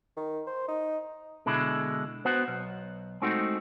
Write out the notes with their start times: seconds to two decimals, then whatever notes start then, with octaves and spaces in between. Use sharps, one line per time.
0.16 D#3
0.47 C5
0.68 D#4
1.46 B2 D3 G#3 E4
2.25 B3 F#4 C5 F#5
2.48 B1
3.22 G#3 A3 C4 D#4 F#4